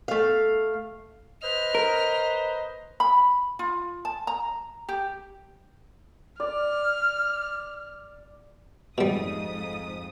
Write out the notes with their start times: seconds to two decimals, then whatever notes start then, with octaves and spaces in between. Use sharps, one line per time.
0.08 A3 F5
1.43 B4 C5 D#5 F6
1.75 A#4
3.00 B5
3.59 F4
4.05 A5
4.27 A#5
4.89 G4
6.40 D5 F6
8.98 F2 G#2 B2 G3 D#6